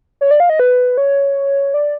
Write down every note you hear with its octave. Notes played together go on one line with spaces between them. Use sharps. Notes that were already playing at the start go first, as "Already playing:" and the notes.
C#5
D5
F5
D#5
B4
C#5
D5